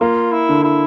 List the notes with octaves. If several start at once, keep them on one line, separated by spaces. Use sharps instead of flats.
A#3 F4
E4
D3
E4